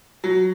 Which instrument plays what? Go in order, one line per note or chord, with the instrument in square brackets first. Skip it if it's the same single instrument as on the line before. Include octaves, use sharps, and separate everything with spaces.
[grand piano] F#3